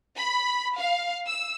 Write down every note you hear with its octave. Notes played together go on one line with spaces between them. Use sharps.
B5
F5
E6